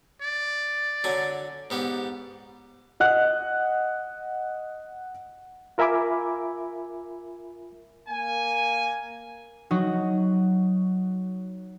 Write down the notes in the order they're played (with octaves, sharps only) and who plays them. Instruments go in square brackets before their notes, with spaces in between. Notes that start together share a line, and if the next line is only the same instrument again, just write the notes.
[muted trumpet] D5
[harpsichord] D3 F#3 G#5
G#2 B3 G4
[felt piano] D#5 F#5 F#6
[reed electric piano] F4 A#4 E5 G#5 B5 D6
[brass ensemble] A#3 G#5
[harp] F#3 D#4 F#4